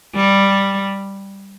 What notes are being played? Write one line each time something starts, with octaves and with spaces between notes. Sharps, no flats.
G3